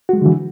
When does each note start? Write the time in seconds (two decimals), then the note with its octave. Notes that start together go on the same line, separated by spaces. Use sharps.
0.09 F#4
0.13 G#3
0.17 F#3
0.22 D3
0.26 E3